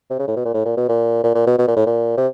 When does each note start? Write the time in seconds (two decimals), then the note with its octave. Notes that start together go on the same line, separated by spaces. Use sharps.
0.10 C3
0.19 C#3
0.27 A2
0.36 B2
0.45 A#2
0.54 A2
0.65 A#2
0.77 B2
0.88 A#2
1.23 A#2
1.34 A#2
1.46 B2
1.58 B2
1.67 A#2
1.76 A2
1.86 A#2
2.17 C3